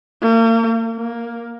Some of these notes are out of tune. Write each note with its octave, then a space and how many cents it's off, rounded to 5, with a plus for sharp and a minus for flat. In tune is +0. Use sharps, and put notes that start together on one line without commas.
A#3 -35
A#3 +10